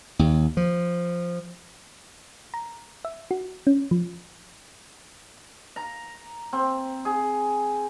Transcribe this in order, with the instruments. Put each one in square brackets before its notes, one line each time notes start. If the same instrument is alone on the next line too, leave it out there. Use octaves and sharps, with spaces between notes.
[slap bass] D#2
F3
[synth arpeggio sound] A#5
E5
F#4
C#4
F3
[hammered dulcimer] A#5
C4
G#4